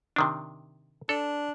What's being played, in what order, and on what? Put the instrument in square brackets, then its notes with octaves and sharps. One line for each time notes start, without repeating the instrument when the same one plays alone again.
[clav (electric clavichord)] C3 D#3 D4
[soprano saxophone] D4 [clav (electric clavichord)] A4